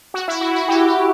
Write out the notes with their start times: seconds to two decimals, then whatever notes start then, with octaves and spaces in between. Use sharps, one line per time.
0.14 F#4
0.28 E4
0.41 F#4
0.55 F#4
0.68 G4
0.87 G4